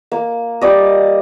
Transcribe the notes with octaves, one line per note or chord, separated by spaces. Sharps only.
A#3
G3 D5 D#5